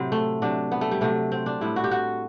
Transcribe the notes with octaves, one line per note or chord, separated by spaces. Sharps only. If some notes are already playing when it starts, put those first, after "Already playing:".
Already playing: A2 C3 F#3 C4 E4
A3
C3 F#3 D4
B3
A3
G3
C3 F#3 A3
C4
D4
A2 G3 E4
F#4
G4
F#4